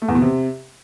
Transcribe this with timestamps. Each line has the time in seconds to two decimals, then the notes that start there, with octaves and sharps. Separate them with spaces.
0.02 A3
0.08 E2
0.15 B2
0.22 C3